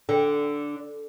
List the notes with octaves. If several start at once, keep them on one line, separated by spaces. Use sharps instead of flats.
D3